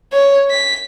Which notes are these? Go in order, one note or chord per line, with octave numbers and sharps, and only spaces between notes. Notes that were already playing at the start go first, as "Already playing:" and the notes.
C#5
B6